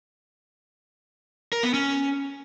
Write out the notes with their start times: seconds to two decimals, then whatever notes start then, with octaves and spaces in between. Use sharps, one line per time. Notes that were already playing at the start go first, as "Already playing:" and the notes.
1.53 A#4
1.63 B3
1.74 C#4